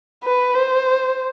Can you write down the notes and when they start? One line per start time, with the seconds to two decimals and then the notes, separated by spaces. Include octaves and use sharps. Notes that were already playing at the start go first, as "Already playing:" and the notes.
0.24 B4
0.55 C5